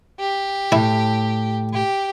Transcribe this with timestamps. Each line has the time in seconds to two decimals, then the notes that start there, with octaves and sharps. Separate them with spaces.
0.20 G4
0.72 A2 E4
1.73 G4